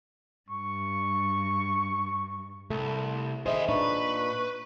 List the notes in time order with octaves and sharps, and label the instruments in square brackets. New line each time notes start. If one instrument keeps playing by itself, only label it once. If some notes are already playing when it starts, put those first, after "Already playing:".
[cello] G2 [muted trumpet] C#6
[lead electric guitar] C2 [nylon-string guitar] A3
[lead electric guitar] D#3 G#4 [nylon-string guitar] C5 D#5 [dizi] E5
[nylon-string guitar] A#2 D4 D#4 [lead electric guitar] B4 [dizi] C#6